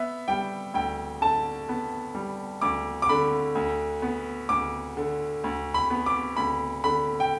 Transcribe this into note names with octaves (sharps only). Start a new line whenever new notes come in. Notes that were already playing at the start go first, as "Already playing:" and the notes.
Already playing: B3 E5
G3 G5
D2 G5
D3 A5
B3
G3
D2 D6
D6
D3 B5
D2
B3
D2 D6
D3
D2
B5
B3
D6
D2 B5
D3 B5
G5